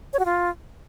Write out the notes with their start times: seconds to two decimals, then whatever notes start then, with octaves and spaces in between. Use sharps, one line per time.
0.13 C#5
0.19 F#4
0.25 F4